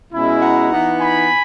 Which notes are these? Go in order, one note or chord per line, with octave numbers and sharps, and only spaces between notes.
B2 G#3 C#4 E4
F#5 A#5
E3 B3 D#4
G#5 B5